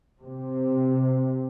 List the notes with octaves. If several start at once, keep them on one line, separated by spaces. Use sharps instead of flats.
C3